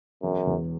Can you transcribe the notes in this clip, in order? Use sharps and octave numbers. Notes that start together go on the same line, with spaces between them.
E1 F#2
E2